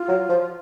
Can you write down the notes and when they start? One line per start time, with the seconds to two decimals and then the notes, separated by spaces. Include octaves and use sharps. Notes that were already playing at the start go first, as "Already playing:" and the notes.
Already playing: F4
0.08 F#3
0.29 F3